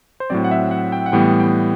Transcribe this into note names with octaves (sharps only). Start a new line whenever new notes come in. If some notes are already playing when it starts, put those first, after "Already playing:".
C5
A2 F#3 C4 D5
F#5
E5
F#5
G5
F#5
A2 E3 G3 B3 G5
G5